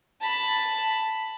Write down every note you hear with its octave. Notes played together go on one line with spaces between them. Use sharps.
A5 B5